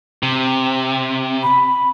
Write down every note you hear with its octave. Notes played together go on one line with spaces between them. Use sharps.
C3
B5